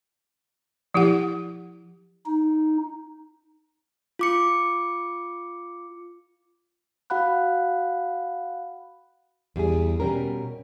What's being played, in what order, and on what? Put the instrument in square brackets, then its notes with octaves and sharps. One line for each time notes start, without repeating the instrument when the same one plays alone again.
[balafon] F3 E4 G4 F#5
[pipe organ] D#4
[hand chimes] F4 D6 C#7
F#4 F5 F#5 B5 F#6
[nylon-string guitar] E2 G3 G#4
B2 G3 C#4 A#4